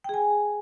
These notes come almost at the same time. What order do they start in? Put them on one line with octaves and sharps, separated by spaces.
G5 G#4 G#5